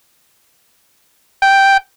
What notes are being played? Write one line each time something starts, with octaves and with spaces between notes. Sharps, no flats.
G5